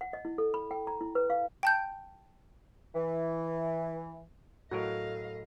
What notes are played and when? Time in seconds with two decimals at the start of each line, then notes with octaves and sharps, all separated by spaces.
0.01 F#5
0.13 D#5
0.25 E4
0.38 A4
0.54 B5
0.71 G5
0.87 A#5
1.01 E4
1.15 B4
1.30 F5
1.63 G5 A5 G6
2.94 E3
4.71 A2 F#3 F#4 A4 A#4 D#5 F5